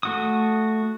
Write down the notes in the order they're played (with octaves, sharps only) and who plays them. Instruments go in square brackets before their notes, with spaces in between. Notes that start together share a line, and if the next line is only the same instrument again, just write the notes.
[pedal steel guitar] A3 F#4 D#6